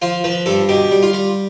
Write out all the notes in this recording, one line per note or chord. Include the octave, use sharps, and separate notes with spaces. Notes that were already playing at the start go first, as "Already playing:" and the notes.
F3 F4
F3 B4
G2 A4
B2 G4
G3
F4
G3